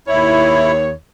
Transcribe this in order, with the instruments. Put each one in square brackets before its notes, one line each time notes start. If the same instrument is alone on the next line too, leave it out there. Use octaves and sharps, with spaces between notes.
[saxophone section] D#2 C#5 [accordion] E4